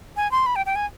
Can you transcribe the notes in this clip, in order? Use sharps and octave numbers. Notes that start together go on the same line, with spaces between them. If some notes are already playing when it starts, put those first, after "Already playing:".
G#5
C6
B5
G5
G5
G#5